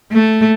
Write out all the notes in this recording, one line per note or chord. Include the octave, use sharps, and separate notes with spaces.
A3